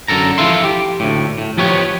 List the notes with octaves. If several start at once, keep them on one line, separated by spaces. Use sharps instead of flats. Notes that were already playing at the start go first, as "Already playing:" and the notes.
F#2 D3 A4 A#5
F3 E4 F4 A4 E5 C6
G4
D2 A2
A2
F3 B3 G4 C#5